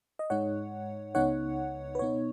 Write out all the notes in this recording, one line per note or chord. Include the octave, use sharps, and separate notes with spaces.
D#5
G#2 G#3 D#4 C#5 F#5
C#2 C#3 B3 D#4 C#5 F#5
B4
B2 B3 D#4 C#5